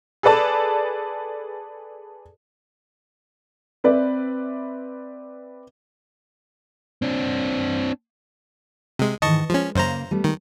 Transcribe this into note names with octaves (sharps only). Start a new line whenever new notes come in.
G#4 A4 B4 D5 A5
C4 B4 D5 E5
C4 D4
C3 G#3
G#2 D#3 E3 D#5 A5 C#6
F3 G#3 C#4
F#2 C#3 A#3 C5 A#5
G3 A3 B3
D#3